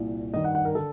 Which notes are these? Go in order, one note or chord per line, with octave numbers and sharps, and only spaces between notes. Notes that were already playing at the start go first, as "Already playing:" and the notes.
Already playing: C2 A#2
G2 D#3 D#5
F#5
F#5
A#4
D3 A4